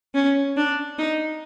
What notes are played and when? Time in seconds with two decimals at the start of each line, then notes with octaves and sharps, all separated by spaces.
0.14 C#4
0.57 D4
0.98 D#4